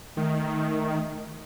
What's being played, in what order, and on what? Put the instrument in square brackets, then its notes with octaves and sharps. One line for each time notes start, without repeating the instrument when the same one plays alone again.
[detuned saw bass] D#3 [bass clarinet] A3